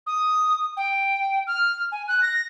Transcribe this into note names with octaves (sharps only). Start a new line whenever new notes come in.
D#6
G5
F6
G#5
F#6
A#6